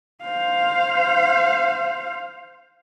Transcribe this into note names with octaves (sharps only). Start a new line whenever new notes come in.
C5 F5